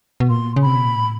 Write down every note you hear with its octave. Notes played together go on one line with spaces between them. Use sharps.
B2
A#2 C6
C#3
C3 B5
B2
A#2
A2